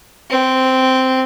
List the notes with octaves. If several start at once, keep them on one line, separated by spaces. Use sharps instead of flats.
C4